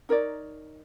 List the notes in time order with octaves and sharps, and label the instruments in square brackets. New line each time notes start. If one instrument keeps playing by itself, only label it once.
[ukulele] D#4 A#4 C#5 D5